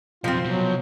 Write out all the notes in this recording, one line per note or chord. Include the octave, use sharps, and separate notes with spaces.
B1 F2 F3 C4 F4
C2 B2 F#3